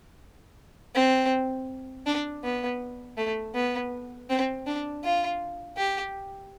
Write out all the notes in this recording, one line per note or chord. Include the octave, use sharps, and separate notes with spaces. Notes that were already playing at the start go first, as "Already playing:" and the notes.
C4
D4
B3
A3
B3
C4
D4
F4
G4